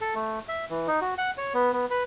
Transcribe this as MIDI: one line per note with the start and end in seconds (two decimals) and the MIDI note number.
0.01 0.14 69
0.15 0.39 57
0.48 0.65 76
0.70 0.87 52
0.87 1.00 63
1.01 1.14 66
1.18 1.31 78
1.38 1.53 73
1.54 1.72 59
1.73 1.86 59
1.91 2.03 71